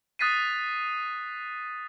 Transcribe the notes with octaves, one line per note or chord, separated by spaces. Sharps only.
D#6 F#6 A6 B6 C7 D#7